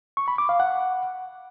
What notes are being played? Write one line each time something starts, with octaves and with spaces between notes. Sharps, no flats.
C#6
B5
D6
F5
F#5